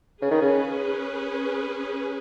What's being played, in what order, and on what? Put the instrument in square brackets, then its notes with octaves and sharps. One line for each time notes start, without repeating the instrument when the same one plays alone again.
[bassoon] C#3 [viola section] C#4 G#4 B4
[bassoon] D#3
C#3